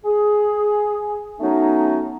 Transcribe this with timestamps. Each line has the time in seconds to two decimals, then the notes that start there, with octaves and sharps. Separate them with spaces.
0.05 G#4
1.40 F#3 A3 B3 C#4 D#4